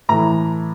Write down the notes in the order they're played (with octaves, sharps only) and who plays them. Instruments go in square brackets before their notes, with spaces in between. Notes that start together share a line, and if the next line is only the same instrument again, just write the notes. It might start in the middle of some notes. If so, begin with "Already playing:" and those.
[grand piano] A2 E3 A3 A#5